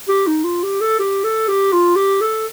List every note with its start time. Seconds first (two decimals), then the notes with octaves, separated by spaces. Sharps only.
0.09 G4
0.27 D#4
0.44 F4
0.63 G4
0.81 A4
1.00 G4
1.24 A4
1.48 G4
1.73 F4
1.96 G4
2.22 A4